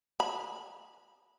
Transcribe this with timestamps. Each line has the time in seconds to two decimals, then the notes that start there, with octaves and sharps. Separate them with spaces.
0.20 B5